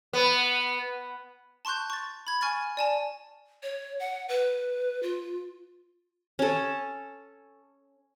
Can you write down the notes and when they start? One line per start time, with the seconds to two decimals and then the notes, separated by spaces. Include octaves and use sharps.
0.13 B3
1.65 A5 C6 C#6 F#6 G6
1.90 C#6 A6
2.27 B5 G#6
2.41 G#5 C#6 F6 G#6 A6
2.77 D5 G#5 A5
3.63 C#5
4.00 F#5
4.29 B4
5.03 F4
6.39 C#4 A4